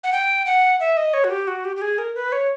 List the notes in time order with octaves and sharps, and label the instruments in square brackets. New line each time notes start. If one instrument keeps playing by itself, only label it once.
[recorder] F#5
G5
F#5
E5
D#5
C#5
F#4
G4
F#4
G4
G4
G#4
A#4
B4
C#5